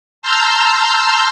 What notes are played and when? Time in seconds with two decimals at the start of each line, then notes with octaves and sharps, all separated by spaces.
0.22 A5 A#5 C6 E6 F6 G6